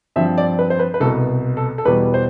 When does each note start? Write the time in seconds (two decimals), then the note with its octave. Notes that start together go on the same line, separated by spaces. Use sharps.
0.16 G2 F3 C4 E5
0.38 D5
0.59 B4
0.70 C5
0.79 B4
0.94 B4
1.00 C2 B2 B3 A4
1.57 A4
1.78 A4
1.85 E2 B2 G3 B3 B4
2.14 C5